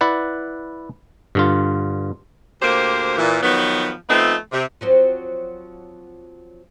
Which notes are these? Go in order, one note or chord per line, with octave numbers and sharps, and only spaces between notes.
E4 B4 D5 F#5
G2 D3 F4
D2 A#3 G4 C5
A#2 E3
D#3 F3 F#3 B3
F3 A3 B3 C4 D#4
C3
F3 F#3 C4